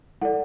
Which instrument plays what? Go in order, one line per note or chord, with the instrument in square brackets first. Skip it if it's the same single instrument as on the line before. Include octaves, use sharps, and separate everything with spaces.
[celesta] E4 A4 D5 F#5